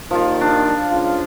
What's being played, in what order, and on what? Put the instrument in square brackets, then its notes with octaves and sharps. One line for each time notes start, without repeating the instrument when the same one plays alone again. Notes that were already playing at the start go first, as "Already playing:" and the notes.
[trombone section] D#2 A#2 D#3 [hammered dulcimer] F3 F4
[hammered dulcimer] D4
[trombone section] C#2 F4